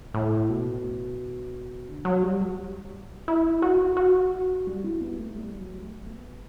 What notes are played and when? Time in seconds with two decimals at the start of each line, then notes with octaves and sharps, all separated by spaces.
0.14 A2
0.50 B2
1.88 D3
2.05 F#3
2.23 G3
3.28 E4
3.62 F#4
3.97 F#4
4.67 G3
4.84 E4
5.01 B3
5.19 A3
5.36 G3
5.59 F#3
5.82 A3
6.05 B3